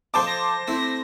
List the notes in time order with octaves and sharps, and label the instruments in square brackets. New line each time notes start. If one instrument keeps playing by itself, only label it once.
[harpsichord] F3 A4 D#5 [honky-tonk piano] C5 A5 D6
[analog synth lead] A#6
[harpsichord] A3 C4 E4